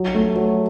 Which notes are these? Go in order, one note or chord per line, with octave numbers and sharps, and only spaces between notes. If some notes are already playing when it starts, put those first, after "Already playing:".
Already playing: F#3
A3
F#3